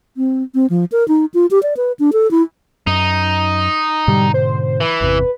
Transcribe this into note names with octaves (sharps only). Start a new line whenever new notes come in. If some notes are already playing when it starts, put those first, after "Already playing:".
C4
C4
F3
A#4
D#4
F4
G4
D5
B4
D4
A4
E4
F#2 D#4
G#2 B2 D3 G3
C5
E3 B4
G1 E2 C3